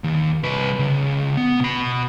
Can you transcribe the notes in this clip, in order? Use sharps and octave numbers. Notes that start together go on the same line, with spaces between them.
D#2
C2 B4
C#2
B3
B2 B5